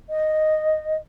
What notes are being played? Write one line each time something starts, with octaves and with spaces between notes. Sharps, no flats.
D#5